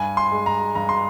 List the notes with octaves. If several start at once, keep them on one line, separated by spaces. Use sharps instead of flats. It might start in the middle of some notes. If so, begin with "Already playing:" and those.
Already playing: G2 G#5
C6
G#3
A#5
G2 A#5
C6